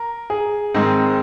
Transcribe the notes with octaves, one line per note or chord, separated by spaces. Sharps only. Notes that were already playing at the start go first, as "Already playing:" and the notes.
Already playing: A#4
G#4
G#2 D#3 G#3 C4 D#4